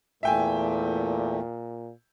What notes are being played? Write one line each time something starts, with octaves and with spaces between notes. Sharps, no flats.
E2 A#2 A3 E5 G5 G#5